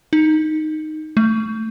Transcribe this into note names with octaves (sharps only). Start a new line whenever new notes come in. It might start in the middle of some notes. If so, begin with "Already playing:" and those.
D#4
A3